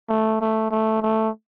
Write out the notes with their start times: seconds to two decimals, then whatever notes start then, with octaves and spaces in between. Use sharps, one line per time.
0.10 A3
0.41 A3
0.71 A3
1.02 A3